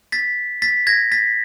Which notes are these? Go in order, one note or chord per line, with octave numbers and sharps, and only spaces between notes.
A6 B6
A6 B6
G#6 A#6
A6 B6